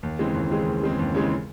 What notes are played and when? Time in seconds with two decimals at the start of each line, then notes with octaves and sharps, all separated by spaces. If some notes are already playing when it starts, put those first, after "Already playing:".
0.03 D#2
0.19 C#3 E3 G#3 C4
0.34 D#2
0.50 C#3 E3 G#3 C4
0.66 D#2
0.83 C#3 E3 G#3 C4
0.99 D#2
1.15 C#3 E3 G#3 C4